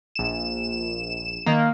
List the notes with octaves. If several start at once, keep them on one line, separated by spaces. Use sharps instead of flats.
A#1 E7
D#3 A#3